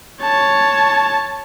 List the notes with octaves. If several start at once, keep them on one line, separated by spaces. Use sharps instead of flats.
C#5 A5